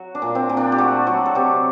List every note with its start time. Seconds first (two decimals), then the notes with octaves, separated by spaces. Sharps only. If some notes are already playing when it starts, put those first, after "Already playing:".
Already playing: F#3 F#4
0.15 D4
0.22 A#2
0.35 C4
0.50 A#2
0.57 D4
0.72 G4
0.78 A3 F#4
1.07 F#3 F#4
1.26 A4
1.35 C3 G4